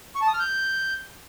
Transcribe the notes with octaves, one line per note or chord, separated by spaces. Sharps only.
C#6
A5
D#6
F6
G6